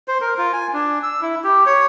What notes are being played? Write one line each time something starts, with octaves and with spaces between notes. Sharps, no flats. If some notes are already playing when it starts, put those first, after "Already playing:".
C5
A#4
F4
G#5
D4
E6
E4
G4
C#5